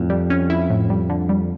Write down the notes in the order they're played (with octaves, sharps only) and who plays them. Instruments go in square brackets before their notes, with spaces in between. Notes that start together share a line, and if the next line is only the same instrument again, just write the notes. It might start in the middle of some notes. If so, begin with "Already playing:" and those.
Already playing: [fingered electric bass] F2 [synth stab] A2
[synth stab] G3
C#4
E4
A2
G3
D3
G3